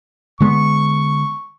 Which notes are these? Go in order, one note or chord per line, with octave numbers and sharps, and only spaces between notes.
D3 G#3 B3 C#6